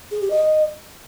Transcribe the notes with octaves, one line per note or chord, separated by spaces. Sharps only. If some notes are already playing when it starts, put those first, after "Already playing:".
G#4
G4
D#5